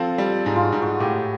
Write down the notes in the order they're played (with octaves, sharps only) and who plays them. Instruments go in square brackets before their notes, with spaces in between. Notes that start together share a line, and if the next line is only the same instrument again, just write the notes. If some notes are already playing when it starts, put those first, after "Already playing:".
Already playing: [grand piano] F3 C4 [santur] F4 A4
[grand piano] G3
[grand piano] G#2 [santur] G#4
[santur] F4
F#4
[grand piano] G#2
[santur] F#4
[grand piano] A2 [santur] G4